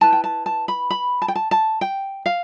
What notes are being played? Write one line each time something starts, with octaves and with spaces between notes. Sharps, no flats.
E4 B4 A5
G5
A5
A5
B5
B5
A5
G5
A5
A5
G5
F5